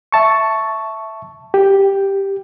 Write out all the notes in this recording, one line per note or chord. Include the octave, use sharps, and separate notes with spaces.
E5 A5 C#6
G4